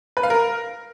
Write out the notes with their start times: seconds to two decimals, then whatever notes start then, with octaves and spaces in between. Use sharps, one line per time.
0.17 B4
0.23 F5
0.30 A#4